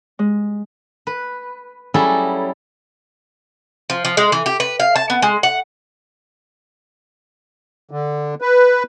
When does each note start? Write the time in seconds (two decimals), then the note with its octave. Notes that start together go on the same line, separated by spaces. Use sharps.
0.19 G#3
1.07 B4
1.94 F#3 G3 C#4 E4 G#4 A4
3.90 F3
4.05 F3
4.17 G#3
4.32 E3
4.46 G4
4.60 B4
4.80 F5
4.96 A5
5.10 B3
5.22 G#3
5.43 F#5
7.91 D3
8.41 B4